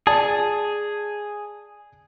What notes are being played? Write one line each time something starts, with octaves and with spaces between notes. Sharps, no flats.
G#4 D5 A5